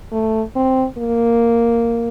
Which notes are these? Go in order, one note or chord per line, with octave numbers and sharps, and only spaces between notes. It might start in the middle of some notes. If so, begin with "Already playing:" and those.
A3
C4
A#3